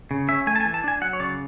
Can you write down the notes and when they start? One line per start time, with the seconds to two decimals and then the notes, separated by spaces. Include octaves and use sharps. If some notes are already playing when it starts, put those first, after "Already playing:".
0.11 C#3
0.29 C#4 E5
0.47 A3 G#5
0.56 A5
0.60 G#5
0.65 E3
0.74 A5
0.84 D4 G#5
1.01 F#3 F#5
1.13 C#5
1.20 C#3 D5